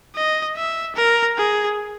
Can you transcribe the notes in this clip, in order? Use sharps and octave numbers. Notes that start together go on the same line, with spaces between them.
D#5
E5
A#4
G#4